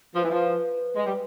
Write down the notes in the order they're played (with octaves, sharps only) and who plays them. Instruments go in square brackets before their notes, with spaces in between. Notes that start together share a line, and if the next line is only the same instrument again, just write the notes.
[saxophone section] F3 [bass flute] B4
[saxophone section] E3
F3
G#3
G3